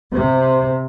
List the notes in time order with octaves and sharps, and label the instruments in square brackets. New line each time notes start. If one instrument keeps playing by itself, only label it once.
[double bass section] C3